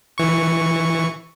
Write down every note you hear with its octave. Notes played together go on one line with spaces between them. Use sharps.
E3 C#6